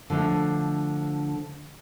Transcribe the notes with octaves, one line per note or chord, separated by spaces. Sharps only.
D3 F3 A3 D4